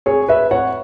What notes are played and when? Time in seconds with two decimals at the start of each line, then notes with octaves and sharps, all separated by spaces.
0.06 G#4 C#5
0.28 B4 E5
0.51 C#5 F#5